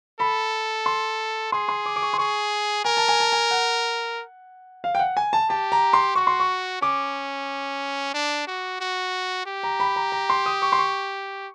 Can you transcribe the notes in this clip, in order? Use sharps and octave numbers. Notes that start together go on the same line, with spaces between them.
A4 B5
C6
G#4 C6
C6
D6
D6
C#6
C6
G#4 C#6
A#4 G#5
A5
G#5
A5
G#5
F#5
F5
G5
F#5
G#5
A5
G4 A5
A#5
C6
F#4 C#6
C6
C#6
C#4 D6
D4
F#4
F#4
G4
A#5
B5
A#5
A#5
C6
D#6
C#6
C6
C#6